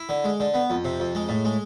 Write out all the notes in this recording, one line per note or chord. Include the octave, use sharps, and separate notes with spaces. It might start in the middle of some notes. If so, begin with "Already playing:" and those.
Already playing: E4
D3
G#3
D3
B3
F2
C3
F2
G#3
A2
G#3